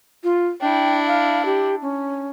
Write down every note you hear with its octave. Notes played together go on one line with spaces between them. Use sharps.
F4
D4 E4 G5
F5
G4
C#4